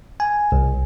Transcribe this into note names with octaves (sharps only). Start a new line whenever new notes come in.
G#5
C2